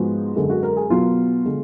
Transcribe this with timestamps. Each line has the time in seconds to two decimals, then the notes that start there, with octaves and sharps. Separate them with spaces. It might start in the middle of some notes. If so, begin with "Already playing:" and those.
Already playing: G#2 F3 G#3 B3 F#4
0.35 F#2 D3 G#3
0.50 F#4
0.63 A#4
0.77 G#4
0.90 B2 F#3 B3 F4
1.45 D3 G#3